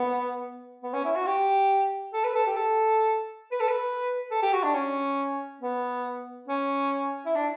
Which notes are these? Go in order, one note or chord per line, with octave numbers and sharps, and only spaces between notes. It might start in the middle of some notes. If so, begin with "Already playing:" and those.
Already playing: B3
B3
C#4
E4
F#4
G4
A4
B4
A4
G4
A4
B4
A4
B4
A4
G4
F#4
D4
C#4
B3
C#4
E4
D4